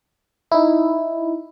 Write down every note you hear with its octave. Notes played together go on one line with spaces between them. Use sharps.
D#4 E4